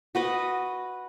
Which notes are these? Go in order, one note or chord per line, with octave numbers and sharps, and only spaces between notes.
F#4 B4 D#5